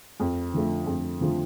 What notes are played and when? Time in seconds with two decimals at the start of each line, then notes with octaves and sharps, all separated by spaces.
0.20 F2
0.54 D3 F3 A3
0.87 F2
1.21 D3 F3 A3